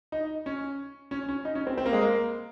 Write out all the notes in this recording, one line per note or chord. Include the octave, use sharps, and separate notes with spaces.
D#4
C#4
C#4
C#4
D#4
C#4
C4
C4
A#3
G#3
A#3